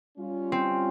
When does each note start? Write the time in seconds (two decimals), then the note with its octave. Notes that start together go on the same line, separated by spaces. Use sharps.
0.18 G3 C#4 F4
0.52 C4